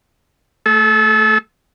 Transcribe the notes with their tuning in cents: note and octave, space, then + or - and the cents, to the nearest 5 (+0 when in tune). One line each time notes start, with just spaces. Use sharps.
A3 +0 A4 -35